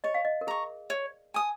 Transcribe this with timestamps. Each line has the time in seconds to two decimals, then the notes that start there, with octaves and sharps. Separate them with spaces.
0.04 C#5 D#5
0.14 F5
0.25 D#5
0.41 A#4
0.47 G#4 A#5 C#6
0.90 C#5
1.34 G#5 D#6